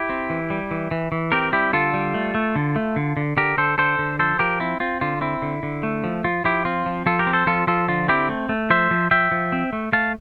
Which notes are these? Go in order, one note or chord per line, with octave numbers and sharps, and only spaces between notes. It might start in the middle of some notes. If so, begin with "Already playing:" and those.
Already playing: E4 G4
C4
E3
G3
E3
E3
E3
C4 G4 A#4
G3 E4 G4
D3 F4 A4
G3
A3
A3
D3
A3
D3
D3
D3 G4 A#4
D3 A4 C5
D3 A4 C5
D3
F3 A4 C5
F3 G4 A#4
C4 E4
C4 F4
D3 F4
C4 E4
D3
D3
A3
F3
F3 F4
F3 E4 G4
C4 F4
F3
F3 F4 A4
G4 A#4
C4
A4 C5
F3 F4 A4
F3 F4 A4
D3 F4
C4 E4 G4
A3
A3
F3 C5 E5
F3
F3 E5 G5
F3
C4
A3
A3 F5 A5